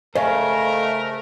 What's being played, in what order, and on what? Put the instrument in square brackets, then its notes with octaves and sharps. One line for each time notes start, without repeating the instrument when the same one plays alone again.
[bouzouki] C#3 [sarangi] A3 [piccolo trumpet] A#4 [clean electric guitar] C5 D#5 F5